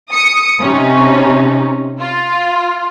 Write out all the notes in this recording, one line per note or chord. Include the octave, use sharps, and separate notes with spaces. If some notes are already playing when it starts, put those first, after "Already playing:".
D#6 C#7
C3 C#4 D#4
F4